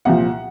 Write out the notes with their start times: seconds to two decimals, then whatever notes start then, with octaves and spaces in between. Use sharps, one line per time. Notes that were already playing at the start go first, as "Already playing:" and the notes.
0.05 C2 A#2 F3 F#5